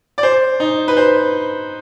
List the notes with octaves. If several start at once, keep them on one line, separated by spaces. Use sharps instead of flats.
D5
C5
D#4
B4
C5